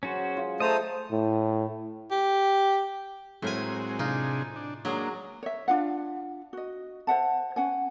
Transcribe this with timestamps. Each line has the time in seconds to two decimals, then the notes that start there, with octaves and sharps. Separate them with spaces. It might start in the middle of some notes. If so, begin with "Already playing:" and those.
0.03 F#3 C#4 F#4 G#4 C5
0.37 F4
0.60 A3 C5 D#5 A5 A#5 D#6
1.12 A2
2.11 G4
3.42 A2 F#3 G#3 C4 A#4 G#5
3.99 C3 D4 D#4 F4 G#4
4.56 D4
4.85 F#3 G#3 A#3 D4 G#4
5.43 C#5 E5
5.68 D4 F4 F5 F#5
6.53 F#4 D#5
7.07 C5 E5 F#5 A5
7.56 C#4 F#5 G#5